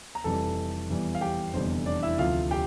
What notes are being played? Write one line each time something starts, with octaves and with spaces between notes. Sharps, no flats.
A#5
F1 F2 E3 G3 A4 A5
E2 E3 G3
F5
G4 G5
F1 E2 D3 G3 C5
D4 D5
E4 E5
D2 C3 F3 F4 F5
G4 G5